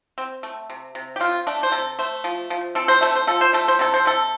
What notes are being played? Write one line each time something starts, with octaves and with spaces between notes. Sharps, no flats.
C4
A3
C3
C3
G4
C4 F4
A3 D4
C5
C3 A4
A3 C5
F3
F3
C4 A4
C5
A3 A4
C5
F3 A4
C5
A3 A4
C5
C3 A4
C5
C3 A4